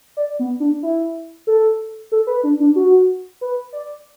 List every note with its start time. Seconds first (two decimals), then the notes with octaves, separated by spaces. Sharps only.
0.17 D5
0.39 B3
0.60 D4
0.83 E4
1.47 A4
2.12 A4
2.27 B4
2.43 D4
2.60 D4
2.76 F#4
3.41 B4
3.73 D5